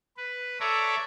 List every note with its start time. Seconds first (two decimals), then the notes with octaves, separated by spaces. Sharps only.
0.17 B4
0.60 A4 C#5 D5 E5 A#5